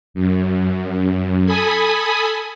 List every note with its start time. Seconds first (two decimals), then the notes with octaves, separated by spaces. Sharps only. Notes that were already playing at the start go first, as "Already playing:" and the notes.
0.14 F#2
1.46 A4 G#5 B5 D#6